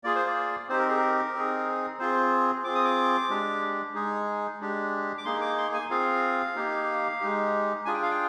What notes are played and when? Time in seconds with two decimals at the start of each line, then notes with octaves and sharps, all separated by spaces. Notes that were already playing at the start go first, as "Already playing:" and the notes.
0.04 A#3 F4 G#4 D5
0.15 C5
0.26 D5
0.69 C4 D#4 G4 C5
0.78 A#4
0.88 G#4
0.97 A#4
1.34 C4 D#4 G#4
1.99 C4 F4 G#4 C5
2.64 C4 F4 G#4 D6
2.75 D#6
2.85 D6
3.29 G#3 D4 G4
3.95 G#3 D#4 G#4
4.60 G#3 D4 G4
5.18 D6
5.25 A#3 D#4 G#4 C6
5.41 D6
5.58 C6
5.74 G#5
5.90 C4 F4 G#4 F5
6.55 A#3 D#4 G4
7.20 G#3 D#4 G4
7.85 D4 F4 G#4 G#5
7.94 G5
8.02 F5
8.11 G5